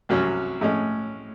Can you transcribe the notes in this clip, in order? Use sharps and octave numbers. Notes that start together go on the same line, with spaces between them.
C2 C3 F#3 C#4
A2 G#3 C#4